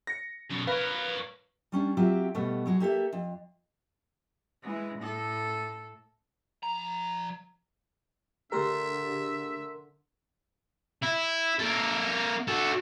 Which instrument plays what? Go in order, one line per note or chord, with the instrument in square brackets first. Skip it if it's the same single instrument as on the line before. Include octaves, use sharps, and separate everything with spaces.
[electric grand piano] A#6 C#7
[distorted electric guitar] F#2 B2
[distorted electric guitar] A#4 C#5 [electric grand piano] B4 F5
[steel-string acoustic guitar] G3 C#4 D4
F#3 C4 F4 G4 E5
B2 G3 A3 B3
F#3 G#3 F#4
A#3 G4 A4 E5
F2
[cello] E3 G#3
A2 A4
[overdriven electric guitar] F3 A#5
[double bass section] D3 [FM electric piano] A3 G4 G#4 [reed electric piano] A#4 C6 [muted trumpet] E5
[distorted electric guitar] E4
A#3 A4
F#4 A4